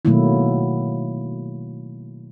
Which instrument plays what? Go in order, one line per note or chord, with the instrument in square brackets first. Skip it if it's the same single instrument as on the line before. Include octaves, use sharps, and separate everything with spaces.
[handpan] B2 D#3 F#3 A3 A#3 E4